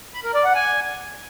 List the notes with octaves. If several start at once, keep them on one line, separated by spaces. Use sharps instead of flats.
B5
A#4
D5
F#5
G#5